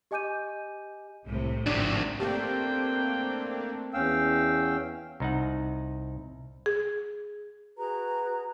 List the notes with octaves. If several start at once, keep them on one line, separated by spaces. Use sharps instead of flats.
G4 D#5 G#5 D6 G6 D#7
C2 A2 C3
G#1 D2 C3 F3 D4
A3 A#3 C4 D4 G4 G5
E2 C#4 F5 G5 E6
C2 D#4 F#5
G#4
F#4 G#4 B4 A#5